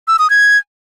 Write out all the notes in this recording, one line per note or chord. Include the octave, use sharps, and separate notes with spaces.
E6
D#6
G#6